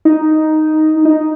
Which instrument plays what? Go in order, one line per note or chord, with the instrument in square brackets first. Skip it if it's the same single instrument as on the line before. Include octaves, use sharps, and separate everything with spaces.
[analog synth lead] D#4
D#4